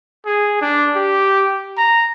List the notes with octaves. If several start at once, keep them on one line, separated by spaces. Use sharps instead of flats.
G#4
D4
G4
A#5